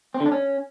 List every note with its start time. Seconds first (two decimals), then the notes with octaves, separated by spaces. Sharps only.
0.14 C4
0.20 D3
0.26 D4
0.32 C#4